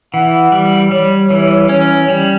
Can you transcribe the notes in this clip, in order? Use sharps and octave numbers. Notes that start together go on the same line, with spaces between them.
E3 F#5
G3
G3 C#5
E3
C#4
G3